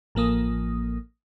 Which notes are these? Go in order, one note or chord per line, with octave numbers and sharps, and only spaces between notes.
A1 F3 A#3 D#6